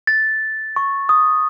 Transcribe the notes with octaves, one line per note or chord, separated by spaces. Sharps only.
A6
C#6
D#6